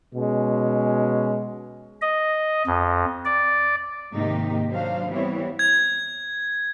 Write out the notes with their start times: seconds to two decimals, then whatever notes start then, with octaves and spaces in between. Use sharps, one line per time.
0.14 B2 G#3 C#4
2.02 D#5
2.67 F2
3.25 D5
4.12 G#2 C3 D#3 A#3 D#4 G4
4.69 F#3 D4 C5 F5
5.09 E3 G3 B3 C4 E4 C#5
5.59 G#6